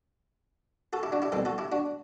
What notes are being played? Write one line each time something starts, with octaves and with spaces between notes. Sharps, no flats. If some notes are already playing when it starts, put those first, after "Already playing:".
F#4 A4
E4 G4
D4 F#4
E4 G4
C2 B2 G3 C4 A4 C5
F#4 A4
E4 G4
D4 F#4